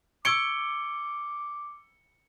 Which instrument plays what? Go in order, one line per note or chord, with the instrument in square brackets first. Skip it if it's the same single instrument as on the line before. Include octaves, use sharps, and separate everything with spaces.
[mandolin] C#6 [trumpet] D6 [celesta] E6 G#6 D7 [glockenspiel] C#7 G7